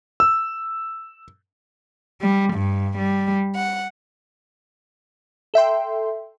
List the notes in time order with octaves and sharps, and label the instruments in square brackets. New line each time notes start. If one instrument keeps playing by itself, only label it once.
[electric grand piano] E6
[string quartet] G3
G2
G3
F#5
[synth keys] A4 E5 G5 C6